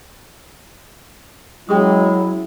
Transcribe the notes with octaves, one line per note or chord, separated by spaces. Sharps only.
F#3 G#3 C#4 E4 G#4 D#6